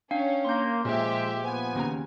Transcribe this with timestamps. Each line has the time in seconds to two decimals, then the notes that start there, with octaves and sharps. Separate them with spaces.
0.11 C#4 D4 F5 G5
0.45 A#3 C6 G6
0.85 A#2 F3 G#3 G4 E5
1.42 F3 B3 G#5
1.75 D#2 C#3 A#5